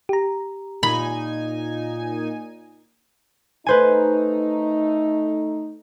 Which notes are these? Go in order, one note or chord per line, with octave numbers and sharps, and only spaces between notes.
G4 A#5
A#2 D#4 G#5 B5
A3 D#4 B4 C5 G#5